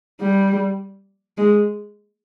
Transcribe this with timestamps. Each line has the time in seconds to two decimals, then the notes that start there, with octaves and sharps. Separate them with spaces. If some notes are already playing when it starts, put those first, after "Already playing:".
0.21 G3
1.38 G#3